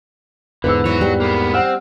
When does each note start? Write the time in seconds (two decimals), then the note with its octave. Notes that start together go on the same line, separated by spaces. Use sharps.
0.64 E2 G#2 D3 B4 E6
0.86 E3 F#4 C#5
1.01 G3
1.20 A#3 B3
1.54 C4 F#5 F6